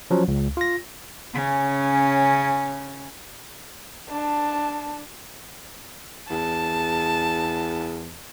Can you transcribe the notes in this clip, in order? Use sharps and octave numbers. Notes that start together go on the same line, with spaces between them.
F3 F#3 C#4
C#2
F4 A#6
C#3 C#4
D4 A5
E2 A5